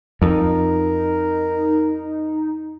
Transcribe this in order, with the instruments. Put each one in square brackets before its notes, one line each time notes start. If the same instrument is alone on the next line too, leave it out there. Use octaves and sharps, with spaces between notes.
[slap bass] F2 [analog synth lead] D#4 [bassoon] A#4